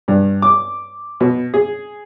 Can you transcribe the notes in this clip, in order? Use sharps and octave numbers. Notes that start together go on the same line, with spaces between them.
G2
D6
B2
G#4